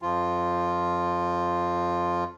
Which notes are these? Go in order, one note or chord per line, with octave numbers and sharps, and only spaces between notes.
F2 F3 F4